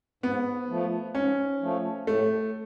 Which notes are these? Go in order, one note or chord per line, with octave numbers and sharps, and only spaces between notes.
G#2 B3
F3 A3
G#2 C#4
F3 A3
A2 A3